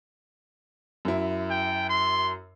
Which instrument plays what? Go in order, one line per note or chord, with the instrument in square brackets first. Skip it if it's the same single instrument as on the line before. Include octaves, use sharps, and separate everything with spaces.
[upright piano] F#2 E4
[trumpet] G5
C6